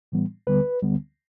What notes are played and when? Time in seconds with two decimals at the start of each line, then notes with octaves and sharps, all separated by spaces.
0.12 A2 E3 G3 B3
0.47 D2 D3 G3 B3 B4
0.82 D2 D3 G3 B3